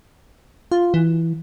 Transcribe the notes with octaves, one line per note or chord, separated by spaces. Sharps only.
F4
E3